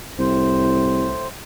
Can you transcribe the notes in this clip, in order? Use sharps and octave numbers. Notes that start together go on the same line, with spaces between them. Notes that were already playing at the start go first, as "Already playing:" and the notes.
C2 A2 C5